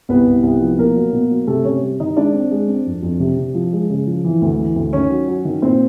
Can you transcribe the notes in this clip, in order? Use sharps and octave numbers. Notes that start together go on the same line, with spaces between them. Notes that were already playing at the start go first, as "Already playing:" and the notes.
C2 B3 B4
C2
C2
F3
B2 A#3 A#4
F#3
B2
F#3
C3 A3 A4
C3 C#4 C#5
G3
D#3 D#4 D#5
G#3 D4 D5
C4
G#3
C4
F2
F2
C3
C3
F3
G#3
C#3
F3
E3
D2
E3
D2
D#3 C#4 C#5
F#3
F#3
D#3
A#2 C4 C5